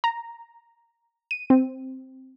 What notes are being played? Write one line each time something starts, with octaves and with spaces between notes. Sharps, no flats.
A#5
D#7
C4